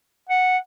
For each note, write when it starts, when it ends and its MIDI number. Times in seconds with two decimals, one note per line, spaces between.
0.29 0.58 78